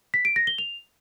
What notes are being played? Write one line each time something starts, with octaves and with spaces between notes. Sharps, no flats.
B6
D7
A#6
G7
F7